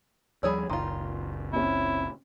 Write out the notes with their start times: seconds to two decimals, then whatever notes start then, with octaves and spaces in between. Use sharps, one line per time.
0.43 D#2 F3 G3 G#4 C#5 D5 B5 E6
0.70 F#1 C#2 D#3 F4 A#5 C6
1.53 C4 C#4 E4